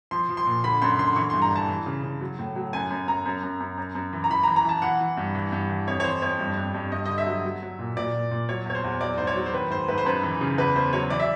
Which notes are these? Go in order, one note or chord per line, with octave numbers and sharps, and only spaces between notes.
F3 C6
F3
C6
A#2
D3 B5
F#2 C6
D3 C6
E3 C#6
G2 C6
A#5
E3 A5
E3
C#3
C#3
F#3
A2
F#3
F#2 G#5
F#2
F#2 A#5
F#2
F#2
F#2
F#2
F#2
E3
A#5
E3 B5
A#5
E3
A#5
E3 A5
E3 F#5
E3
G2
E3
G2
E3
F2 C#5
C#5
E3 C5
F2 C#5
G2
G2
G2
G2 D#5
D3 D#5
E5
F#3
F#3
F#3
A#2
A#2 D5
A#2
A#2
F#3 C#5
E2 C#5
C5
E2
F#3 D5
G#2 C5
C#5
F#3
C5
D#3 B4
G#2 C5
G#2 B4
C5
F#2 B4
E3
C#3
E2 B4
E2 C5
F#3 C#5
E3 D5
E5